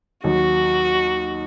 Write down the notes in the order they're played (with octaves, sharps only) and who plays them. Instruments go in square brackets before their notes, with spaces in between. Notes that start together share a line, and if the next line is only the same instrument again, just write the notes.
[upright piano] D#2 D#3 F#3 [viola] F#4